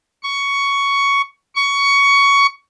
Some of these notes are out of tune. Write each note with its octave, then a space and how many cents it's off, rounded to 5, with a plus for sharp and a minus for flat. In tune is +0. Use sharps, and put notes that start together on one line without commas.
C#6 +10
C#6 +15